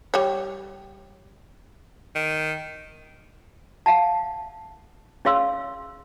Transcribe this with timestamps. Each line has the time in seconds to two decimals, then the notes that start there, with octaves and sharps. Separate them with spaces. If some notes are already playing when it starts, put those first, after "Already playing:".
0.14 G3 C#5
2.15 D#3
3.86 F5 F#5 A5
5.25 C#4 G#4 C#5 F5 C6 E6